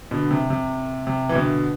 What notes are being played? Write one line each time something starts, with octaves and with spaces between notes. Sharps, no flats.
B2 D3
C3
C3
C3
E3
B2 D3